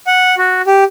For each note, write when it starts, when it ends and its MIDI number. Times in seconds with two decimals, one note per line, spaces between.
0.07 0.35 78
0.38 0.62 66
0.67 0.84 67